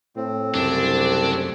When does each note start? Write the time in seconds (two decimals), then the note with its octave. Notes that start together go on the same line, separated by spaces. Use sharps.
0.16 A2 C4
0.54 C2 F#2 C#3 A3 D4